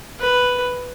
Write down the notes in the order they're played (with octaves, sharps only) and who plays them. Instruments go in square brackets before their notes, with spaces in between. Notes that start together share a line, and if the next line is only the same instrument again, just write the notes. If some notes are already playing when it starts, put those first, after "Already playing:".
[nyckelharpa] B4